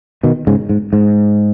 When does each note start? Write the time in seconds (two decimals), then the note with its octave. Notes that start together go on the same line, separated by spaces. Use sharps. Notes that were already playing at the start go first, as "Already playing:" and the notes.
0.23 B2 D#3
0.47 G#2 C#3
0.69 G#2
0.93 G#2